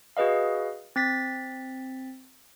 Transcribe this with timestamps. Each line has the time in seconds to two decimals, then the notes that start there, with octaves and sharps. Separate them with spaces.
0.17 F#4 G#4 B4 D#5 F5
0.96 C4 A6 B6